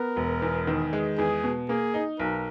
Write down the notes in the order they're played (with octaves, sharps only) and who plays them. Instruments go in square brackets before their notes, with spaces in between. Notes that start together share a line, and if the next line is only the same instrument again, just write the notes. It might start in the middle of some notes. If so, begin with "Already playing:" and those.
Already playing: [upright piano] B3 [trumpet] A#4
[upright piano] E1
E2
D#3
G#3
[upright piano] E2 [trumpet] G#4
[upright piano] B2
[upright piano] A#3 [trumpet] G#4
[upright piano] D#4
[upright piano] B1 [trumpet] A#4